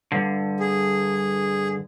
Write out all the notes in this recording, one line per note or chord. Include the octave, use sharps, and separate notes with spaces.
G2 D3
G#4